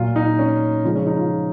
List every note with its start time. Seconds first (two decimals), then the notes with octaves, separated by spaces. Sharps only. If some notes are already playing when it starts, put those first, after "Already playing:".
Already playing: A#2 F#3 F4
0.16 D#4
0.39 C#4
0.84 C#3 F3 G#3
0.95 C#4
1.07 D#4
1.19 F4
1.30 G#4